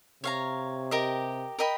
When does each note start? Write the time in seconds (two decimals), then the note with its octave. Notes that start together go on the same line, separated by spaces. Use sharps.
0.23 C3 C#5 F5 A#5
0.91 G4 A#4 D#5
1.59 A#4 D#5 G5 B5